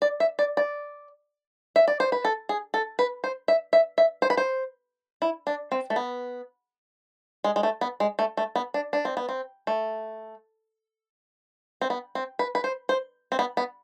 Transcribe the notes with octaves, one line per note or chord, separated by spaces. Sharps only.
D5
E5
D5
D5
E5
D5
C5
B4
A4
G#4
A4
B4
C5
E5
E5
E5
C5
B4
C5
E4
D4
C4
A3
B3
G#3
G#3
A3
B3
G#3
A3
A3
B3
D4
D4
C4
B3
C4
A3
C4
B3
C4
B4
B4
C5
C5
C4
B3
B3